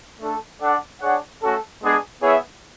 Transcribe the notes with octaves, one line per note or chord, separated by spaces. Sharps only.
A3 D4 A4
D4 A4 D5 F#5
D4 G#4 C#5 F#5
A3 C#4 F#4 A4
G#3 B3 D4 G#4
B3 E4 G#4 C#5 E5